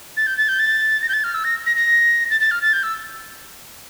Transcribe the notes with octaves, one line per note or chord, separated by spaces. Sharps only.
A6
G6
A6
G6
A6
A#6
G6
A6
F6
E6
A#6
A#6
A#6
A6
A6
F6
A6
G6
E6